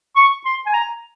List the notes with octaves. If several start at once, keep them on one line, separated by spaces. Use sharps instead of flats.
C#6
C6
G#5
A#5